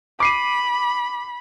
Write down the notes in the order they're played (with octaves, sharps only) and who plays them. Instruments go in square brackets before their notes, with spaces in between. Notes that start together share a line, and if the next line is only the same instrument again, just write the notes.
[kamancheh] B5 [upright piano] D6 C7 D#7